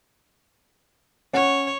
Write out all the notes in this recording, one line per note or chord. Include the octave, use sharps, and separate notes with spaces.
C#4 C#5 F#5